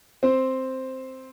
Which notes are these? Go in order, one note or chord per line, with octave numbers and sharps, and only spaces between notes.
C4 C5